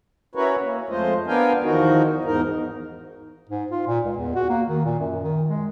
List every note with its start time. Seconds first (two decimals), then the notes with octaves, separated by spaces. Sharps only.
0.35 C#4 E4 F#4 A#4 B4 C#5
0.62 A#3
0.89 F2 G#3 A3 F4 C5 D#5
1.27 B3 D4 A#4 F5 G5 G#5
1.63 E2 D#3 F3 D#4 F#4 A#4
2.25 E2 G#2 D#4 A#4
3.49 G#2
3.71 F4
3.87 A#2
4.05 C#2
4.17 E2
4.35 F#4
4.49 A#3
4.68 D#3
4.85 A#2
5.00 F#2
5.24 D#3
5.49 G#3